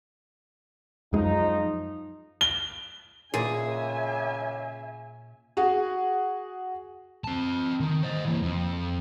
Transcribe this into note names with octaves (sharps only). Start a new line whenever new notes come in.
F#2 F3 G#3 D#4
G7
A#2 C#3 G#4 E5 G#5
F#4 G#4
C4 A5
D#3
C5 D#5
E3 A#3
F2